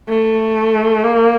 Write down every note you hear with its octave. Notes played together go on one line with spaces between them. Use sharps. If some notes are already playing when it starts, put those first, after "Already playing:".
A3
A#3